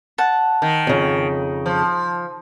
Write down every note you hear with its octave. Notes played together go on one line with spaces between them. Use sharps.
F#5 A5
D#3
F2 C#3
F3